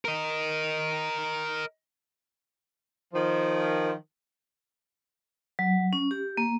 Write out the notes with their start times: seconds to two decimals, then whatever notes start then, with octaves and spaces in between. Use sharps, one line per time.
0.05 A#4 D#5
3.14 D#3 F3
5.59 F#3
5.93 C#4
6.11 G4
6.37 A#3